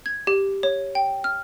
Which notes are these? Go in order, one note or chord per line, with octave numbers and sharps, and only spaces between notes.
G#6
G4
C#5
G5
F6